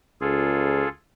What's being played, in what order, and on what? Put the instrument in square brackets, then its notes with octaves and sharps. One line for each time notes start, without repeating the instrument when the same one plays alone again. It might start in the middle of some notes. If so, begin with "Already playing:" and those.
[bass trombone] C#2 [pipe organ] F4 G#4 A4